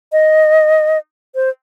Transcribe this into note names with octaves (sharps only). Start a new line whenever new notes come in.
D#5
C5